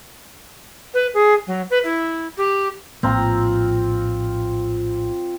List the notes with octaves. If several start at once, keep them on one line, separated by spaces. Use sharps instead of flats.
B4
G#4
F#3
B4
E4
G4
A#1 A2 A#3 C4 F4 A#5